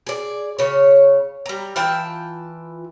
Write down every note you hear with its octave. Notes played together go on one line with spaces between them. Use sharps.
G#4 D5
C#3 C#5
G3 A#5
E3 F4 G5 A5